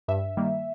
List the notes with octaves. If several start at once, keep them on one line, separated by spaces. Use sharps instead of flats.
G2 E5
D#3 G3 A#3